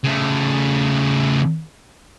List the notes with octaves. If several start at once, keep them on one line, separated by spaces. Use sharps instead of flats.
C#3 A3